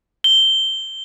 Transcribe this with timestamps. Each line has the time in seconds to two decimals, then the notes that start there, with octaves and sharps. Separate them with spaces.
0.24 G7